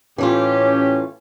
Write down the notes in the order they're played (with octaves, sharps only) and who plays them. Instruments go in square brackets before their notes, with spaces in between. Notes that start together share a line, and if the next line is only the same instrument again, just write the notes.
[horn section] A2 C#4 G4 [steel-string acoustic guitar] E3 A3 F4